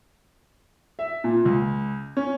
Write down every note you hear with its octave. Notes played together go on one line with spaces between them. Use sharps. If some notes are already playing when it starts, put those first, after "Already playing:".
E5
A#2
C#2
C#4